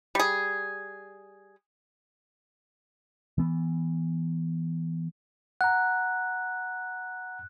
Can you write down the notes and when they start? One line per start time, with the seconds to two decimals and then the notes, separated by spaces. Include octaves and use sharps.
0.15 G3 G#4
3.38 E3 B3
5.61 F#5 A#5 F#6